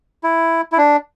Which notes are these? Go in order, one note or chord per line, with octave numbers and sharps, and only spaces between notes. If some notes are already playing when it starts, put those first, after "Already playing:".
E4
E4
D4